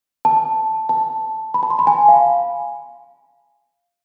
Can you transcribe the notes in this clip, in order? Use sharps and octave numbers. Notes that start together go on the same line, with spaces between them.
A5
A5
B5
A5
C6
B5
G#5
F5